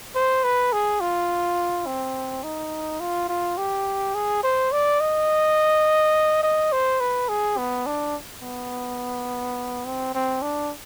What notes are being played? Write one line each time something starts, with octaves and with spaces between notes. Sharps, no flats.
C5
B4
G#4
F4
C4
D#4
F4
F4
G4
G#4
C5
D5
D#5
D#5
C5
B4
G#4
B3
D4
B3
C4
C4
D4